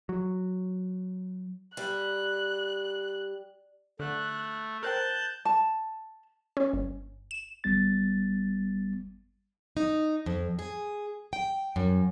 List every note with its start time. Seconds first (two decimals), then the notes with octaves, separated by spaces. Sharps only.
0.09 F#3
1.77 G3 F#6
4.00 D3 A3 F#6
4.83 A#4 C5 G5 A5 F#6 G6
5.45 A5
6.57 C#4
6.73 G1
7.31 E7
7.64 G1 G3 B3 A6
9.77 D#4
10.26 F2
10.59 G#4
11.33 G5
11.76 F#2